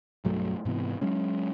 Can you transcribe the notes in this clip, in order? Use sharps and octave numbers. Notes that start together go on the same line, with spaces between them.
B1 G2 F#3 A3
G#2 C3 E3 B3
F#3 G#3 C#4